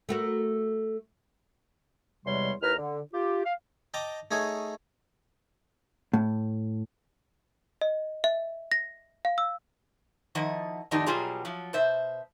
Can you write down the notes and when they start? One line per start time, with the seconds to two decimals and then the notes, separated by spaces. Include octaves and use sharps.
0.09 A3 F#4 A#4
2.26 E2 C3 G3 G#3 C#5 C6
2.62 D#2 E4 B4 A#5 F6
2.78 D3
3.14 F4 G4
3.44 F5
3.94 D#5 G5 A5 A#5 D6
4.31 A3 D#4 G#4 C#5
6.13 A2
7.81 D#5
8.24 E5
8.72 A#6
9.25 F5
9.38 E6
10.35 D#3 F3 E4 D#5 F#5
10.91 F2 A2 D#3 D4 D#4 G4
11.06 B2 F#3 G3 F4 G#4 A#5
11.45 F3 F#3
11.73 B2 C5 E5